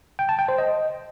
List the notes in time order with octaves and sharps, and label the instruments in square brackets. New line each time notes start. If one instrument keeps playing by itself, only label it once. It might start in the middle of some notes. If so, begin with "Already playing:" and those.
[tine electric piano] G5
A5
G5
C5
D#5